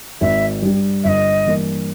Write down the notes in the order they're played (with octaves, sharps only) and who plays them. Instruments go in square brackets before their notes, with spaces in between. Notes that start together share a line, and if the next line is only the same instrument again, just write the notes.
[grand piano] G#1 [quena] E5
[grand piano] G2 G3
[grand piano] G1 [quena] D#5 E5
[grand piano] G2 E3 A#3